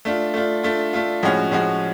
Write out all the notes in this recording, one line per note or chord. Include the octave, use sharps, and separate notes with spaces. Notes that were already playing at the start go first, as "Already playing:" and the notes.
A3 D4 F4
A3 D4 F4
A3 D4 F4
A3 D4 F4
A2 F3 G#3 C#4 F#4
A2 F3 G#3 C#4 F#4